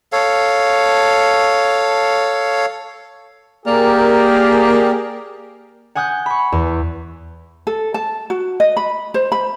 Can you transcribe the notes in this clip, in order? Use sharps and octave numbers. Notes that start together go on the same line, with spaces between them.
A4 C#5 F5
A#3 G4 G#4 A#4 D5
F#5 G#5 D#6 F#6 G6
B5 C#6
E2
A4
A5
F#4
D#5
B5
C5
B5